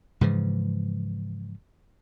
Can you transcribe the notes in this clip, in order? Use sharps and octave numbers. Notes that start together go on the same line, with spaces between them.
G#2 C#3 E3 F3